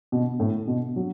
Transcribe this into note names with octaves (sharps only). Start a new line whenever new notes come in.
B2
A2
B2
F#3